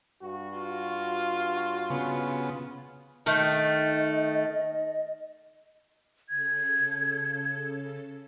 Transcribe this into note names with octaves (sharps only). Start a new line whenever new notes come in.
G2 F#4
F4
C#3 B3
D#3 A3 D#5
C#3 A4 G#6